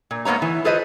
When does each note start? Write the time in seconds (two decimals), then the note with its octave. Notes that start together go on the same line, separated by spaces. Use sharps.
0.11 A#2
0.25 G#2 A#3 B3 C#5 A#5
0.42 E3
0.65 F4 G#4 A4 B4 C5 D#5